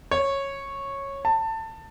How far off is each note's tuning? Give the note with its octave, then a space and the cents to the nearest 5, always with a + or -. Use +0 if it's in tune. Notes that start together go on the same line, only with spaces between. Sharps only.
C#5 -10
A5 +20